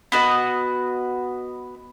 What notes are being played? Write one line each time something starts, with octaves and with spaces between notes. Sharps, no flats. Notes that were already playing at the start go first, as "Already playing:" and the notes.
B3 F#4 D#5